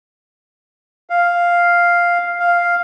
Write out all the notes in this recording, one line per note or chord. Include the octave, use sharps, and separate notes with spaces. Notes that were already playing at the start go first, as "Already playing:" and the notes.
F5
F5